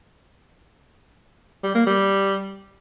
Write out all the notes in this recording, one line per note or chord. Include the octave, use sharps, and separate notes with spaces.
G3
A#3
G3